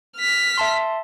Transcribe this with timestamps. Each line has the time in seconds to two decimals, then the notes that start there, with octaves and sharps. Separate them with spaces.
0.17 F6 B6
0.58 E5 A5 C6